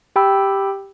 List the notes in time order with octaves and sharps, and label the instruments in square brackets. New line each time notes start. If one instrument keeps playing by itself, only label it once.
[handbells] G4 G5 B5 E6